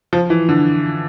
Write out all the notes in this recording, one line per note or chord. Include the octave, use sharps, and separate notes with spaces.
F3
E3
D3